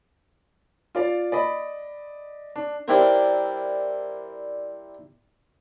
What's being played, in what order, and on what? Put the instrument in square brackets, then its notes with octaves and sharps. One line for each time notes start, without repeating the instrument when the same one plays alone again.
[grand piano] F4 D5 F5
D5 D#5 B5
D4
[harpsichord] G3 C4 D4 E4 A#4